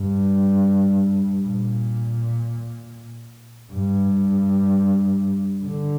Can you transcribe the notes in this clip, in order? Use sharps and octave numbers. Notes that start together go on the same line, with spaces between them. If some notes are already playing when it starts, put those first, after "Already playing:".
Already playing: G2
A#2
G2
D3